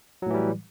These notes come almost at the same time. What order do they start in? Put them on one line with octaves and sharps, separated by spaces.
F#3 A2 E3 G3